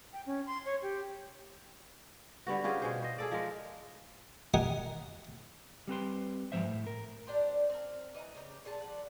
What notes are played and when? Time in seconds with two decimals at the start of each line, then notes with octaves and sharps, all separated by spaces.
0.13 G5
0.26 C#4
0.47 C6
0.65 C#5
0.82 G4
2.47 D3 G3 B3 F#4
2.64 C#4 F4 G4 G#4
2.82 B2 G#4 C5
3.02 C5 D#5
3.18 G#4 A4 D5
3.32 F3 G#3 A#4
4.54 G4 A#4 D#5 F#5 G#5
5.88 G3 C4 B4 C6
6.52 G#2 E3 F3 C5 E5
6.65 A2
6.87 A#4
7.27 D4 G4 C5
7.70 C4 A#4
8.15 E3 D#5 G#5 A#5
8.35 C#3 G4 A#5
8.65 A#2 G#4 A5
8.80 F3 D5 F#5